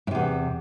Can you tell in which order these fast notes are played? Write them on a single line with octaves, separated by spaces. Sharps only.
A2 C3 E2